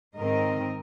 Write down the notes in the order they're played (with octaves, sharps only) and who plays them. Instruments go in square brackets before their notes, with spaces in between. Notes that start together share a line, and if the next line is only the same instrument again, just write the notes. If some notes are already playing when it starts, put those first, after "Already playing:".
[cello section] G#2 D#3 C4 A#4 D#5